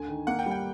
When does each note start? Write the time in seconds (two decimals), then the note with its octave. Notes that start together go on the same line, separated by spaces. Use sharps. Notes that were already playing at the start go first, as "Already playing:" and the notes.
Already playing: D2 G#5
0.08 D#3
0.27 A#3 F#5
0.39 G5
0.46 G3
0.51 G5